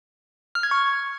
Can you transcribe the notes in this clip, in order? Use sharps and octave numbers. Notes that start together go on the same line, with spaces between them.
F6
G#6
C#6